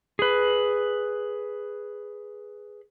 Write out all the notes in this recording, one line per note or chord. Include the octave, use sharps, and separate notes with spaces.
G#4 B4